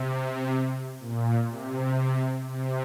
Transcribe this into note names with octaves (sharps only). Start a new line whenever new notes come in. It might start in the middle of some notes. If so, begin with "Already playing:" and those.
Already playing: C3
A#2
C3
C3